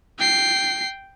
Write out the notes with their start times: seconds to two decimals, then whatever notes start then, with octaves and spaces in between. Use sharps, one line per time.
0.19 G5 C7